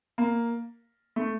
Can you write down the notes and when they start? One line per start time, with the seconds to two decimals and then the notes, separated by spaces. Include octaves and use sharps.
0.18 A#3
1.16 A3